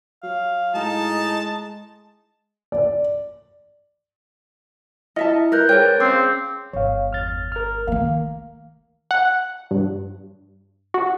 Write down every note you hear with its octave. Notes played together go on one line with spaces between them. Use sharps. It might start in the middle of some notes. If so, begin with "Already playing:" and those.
F#3 F5
A2 G#3 D#4 A5
D5
E4 D#5 E5 A5
A#4 B4 F#6 G6
G#4 A#4 C5 C#5 G5
C4 C#4 F5 D6
G1 C#5 F5
E2 F6 A6
A#4 F6
D#3 A3 A#3 F5
F#5
G2
F#4